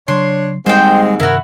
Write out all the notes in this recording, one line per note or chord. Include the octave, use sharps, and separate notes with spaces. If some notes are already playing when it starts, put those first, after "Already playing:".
C#3 F#3 D4 C#5 C6
D#2 G#2 G3 G#3 C4 C5 G5
G2 C3 D#3 E4 F#4 A#4